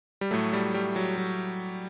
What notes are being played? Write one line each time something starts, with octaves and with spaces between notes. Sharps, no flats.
G3
A2 F#3 A3
G3
G3
F#3
F#3